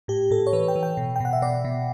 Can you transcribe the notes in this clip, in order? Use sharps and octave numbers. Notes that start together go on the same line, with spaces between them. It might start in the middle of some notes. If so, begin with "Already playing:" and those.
A2 G4
A2 A4
C#5
E3 B4
G5
E3
G5
B2
G5
B2 F#5
E5
B2 D5
B2